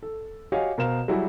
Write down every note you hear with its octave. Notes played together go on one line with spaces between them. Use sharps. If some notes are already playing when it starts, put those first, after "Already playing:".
A4
F#4 G4 C#5 D#5 F5 G#5
B2 A#4 C5 F5 E7
F#3 G3 E4 F#4 G#4